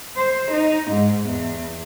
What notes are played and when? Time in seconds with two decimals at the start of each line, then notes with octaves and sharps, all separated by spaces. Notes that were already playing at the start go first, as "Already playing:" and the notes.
0.16 C5
0.52 D#4
0.91 G#2
1.28 E2